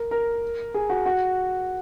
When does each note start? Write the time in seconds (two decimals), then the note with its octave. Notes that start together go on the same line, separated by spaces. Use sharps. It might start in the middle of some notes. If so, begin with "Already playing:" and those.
Already playing: A#4
0.11 A#4
0.74 G#4
0.90 F#4
1.06 F#4